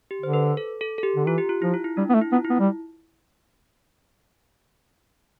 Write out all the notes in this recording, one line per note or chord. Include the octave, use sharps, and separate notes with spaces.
G4
D3 C5
B4
A4
A4
A4
G4
D3
E3 F4
G4
F4
F3 E4
F4
E4
G3 D4
B3
A3
E4
B3 F4
E4
B3
G3